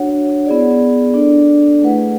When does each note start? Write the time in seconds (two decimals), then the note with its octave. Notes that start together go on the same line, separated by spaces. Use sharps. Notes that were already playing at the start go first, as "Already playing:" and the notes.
Already playing: D4 F#4 C#5 F#5
0.46 B3 E4 G#4 D5
1.14 D4 A4 D5
1.82 A3 E4 G#4 B4 F#5